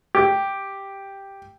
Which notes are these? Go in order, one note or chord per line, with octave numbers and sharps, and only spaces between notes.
G4